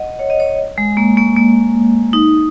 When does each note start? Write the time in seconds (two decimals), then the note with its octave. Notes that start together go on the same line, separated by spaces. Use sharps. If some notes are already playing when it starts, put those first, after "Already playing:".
Already playing: D#5 F#5
0.19 C#5
0.30 D#5
0.40 C#5
0.78 G#3
0.97 A#3
1.17 A#3
1.36 A#3
2.13 D#4